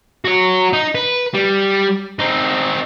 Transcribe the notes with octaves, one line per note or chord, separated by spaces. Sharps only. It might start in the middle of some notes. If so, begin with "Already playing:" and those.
F#4 C#5
D#4
B4
G3
C4 D#4